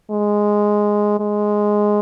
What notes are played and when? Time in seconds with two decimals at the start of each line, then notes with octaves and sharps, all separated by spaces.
0.11 G#3
1.20 G#3